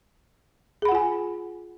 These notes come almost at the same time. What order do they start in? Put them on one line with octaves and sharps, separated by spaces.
G#4 B5 F#5 F4 G#5